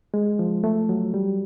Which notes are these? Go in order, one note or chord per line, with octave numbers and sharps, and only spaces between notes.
G#3
F3
A3
F#3
G3